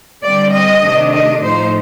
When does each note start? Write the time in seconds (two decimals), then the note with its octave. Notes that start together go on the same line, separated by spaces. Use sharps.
0.24 D3 G3 C4 D5
0.53 D#5
0.83 C3 D#3 A3 D4
1.13 D#5
1.43 A2 F3 A3 D#4 C5